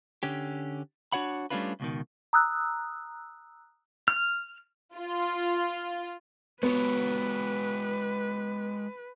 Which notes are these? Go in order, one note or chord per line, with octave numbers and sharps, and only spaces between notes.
D3 C#4 G4
D4 F#4 C#5 F#5 B5
G3 A3 C#4 D4 F4 B4
C#2 B2 D#3
A#5 D#6 E6 F#6
F6
F4
G#3 B3 F#4 B4 C#5